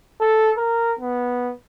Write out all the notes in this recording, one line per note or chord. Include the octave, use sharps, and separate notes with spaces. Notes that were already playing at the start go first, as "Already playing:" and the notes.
A4
A#4
B3